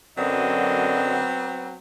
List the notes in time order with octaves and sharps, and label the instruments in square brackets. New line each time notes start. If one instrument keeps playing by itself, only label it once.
[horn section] F#2 D3 D#5 [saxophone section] F#3 B3 C4